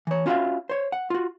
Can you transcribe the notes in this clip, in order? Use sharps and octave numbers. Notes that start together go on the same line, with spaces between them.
E3 C#5
C#4 F4 F#4 D5 E5 F5
C5 C#5
F#5
F4 F#4